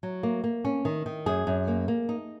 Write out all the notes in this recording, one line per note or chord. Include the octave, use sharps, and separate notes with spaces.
F#3
A#3
A#3
C#4
D#3
D#3
F#2 G#4
F#2
A#3
A#3
D#4